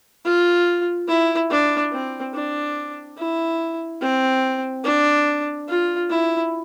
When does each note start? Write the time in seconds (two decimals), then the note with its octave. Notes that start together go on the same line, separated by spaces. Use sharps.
0.25 F4
1.08 E4
1.50 D4
1.92 C4
2.34 D4
3.17 E4
4.01 C4
4.84 D4
5.68 F4
6.10 E4